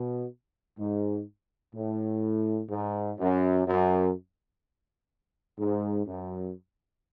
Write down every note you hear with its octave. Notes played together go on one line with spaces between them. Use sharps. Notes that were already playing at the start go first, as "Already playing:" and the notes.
Already playing: B2
G#2
A2
G#2
F#2
F#2
G#2
F#2